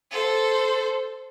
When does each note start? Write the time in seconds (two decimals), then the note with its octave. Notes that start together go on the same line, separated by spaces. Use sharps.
0.11 A4 C5